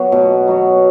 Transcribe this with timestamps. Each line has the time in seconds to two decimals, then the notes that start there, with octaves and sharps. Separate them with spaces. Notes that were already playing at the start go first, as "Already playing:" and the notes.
Already playing: F#3 B3 F#4
0.12 B2
0.47 F#3 B3 F#4